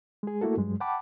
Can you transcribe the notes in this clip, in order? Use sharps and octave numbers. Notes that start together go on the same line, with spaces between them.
G#3 G#4
A3 A#3 E4 F#4 A4
G2 F#3 G#3
F#5 G5 A5 B5 D6